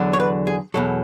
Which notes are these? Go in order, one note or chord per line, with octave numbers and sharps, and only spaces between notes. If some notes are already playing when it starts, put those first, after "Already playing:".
Already playing: E2 D3 F#3
C#5
B4
G#4
E2 B2 F#3 A4